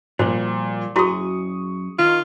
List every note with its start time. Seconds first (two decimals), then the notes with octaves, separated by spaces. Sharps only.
0.19 A#2 F3 G3 C5
0.96 F#2 E4 F#4 G#4 C#6 D#6
1.99 D#3 D#4 F4